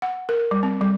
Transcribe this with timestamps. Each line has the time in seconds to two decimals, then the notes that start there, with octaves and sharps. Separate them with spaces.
0.02 F#5
0.29 A#4
0.51 G3
0.63 C4
0.81 G3